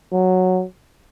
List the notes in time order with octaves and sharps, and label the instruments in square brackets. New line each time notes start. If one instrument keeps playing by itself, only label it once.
[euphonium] F#3